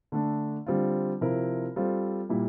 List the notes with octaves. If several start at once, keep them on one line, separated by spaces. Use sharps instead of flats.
D3 A3 D4
D3 G3 C4 F4
C3 F3 C4 E4 A#4
G3 C4 F4 A4 C5
A#2 G3 A#3 E4